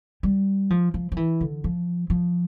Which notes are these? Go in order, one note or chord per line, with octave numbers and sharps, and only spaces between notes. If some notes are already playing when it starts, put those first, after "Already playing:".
G3
F3
F3
F3
E3
D3
F3
F3